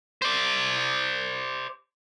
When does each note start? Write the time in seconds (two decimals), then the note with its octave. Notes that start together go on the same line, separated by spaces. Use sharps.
0.22 C5 D5